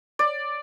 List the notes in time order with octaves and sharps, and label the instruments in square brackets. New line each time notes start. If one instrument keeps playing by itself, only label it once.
[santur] D5